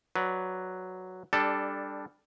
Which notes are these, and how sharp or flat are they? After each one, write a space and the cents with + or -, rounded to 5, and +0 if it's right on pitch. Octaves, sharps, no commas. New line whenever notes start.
F#3 +0 B4 +0 D5 +0
G3 +15 D4 +0 A4 +0